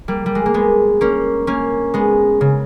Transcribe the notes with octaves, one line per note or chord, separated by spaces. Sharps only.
G3 A#3
G3
G#3
A#3
G#3 B3
A#3 C#4
A#3 C#4
G#3 B3
C#3